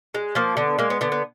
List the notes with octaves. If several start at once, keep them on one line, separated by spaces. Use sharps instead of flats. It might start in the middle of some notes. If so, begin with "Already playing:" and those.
G#3
F3 A#3
D3 B3
G#3 A#3
B3
D3 B3
B3